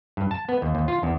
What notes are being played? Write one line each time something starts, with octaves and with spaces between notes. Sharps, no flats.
G2
A5
B3
D#2
D#2
F4
E2